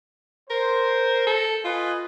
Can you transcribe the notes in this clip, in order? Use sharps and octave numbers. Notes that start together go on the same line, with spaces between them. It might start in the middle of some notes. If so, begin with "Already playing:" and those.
A#4 C5
A4
F4 B4 D#5 G#5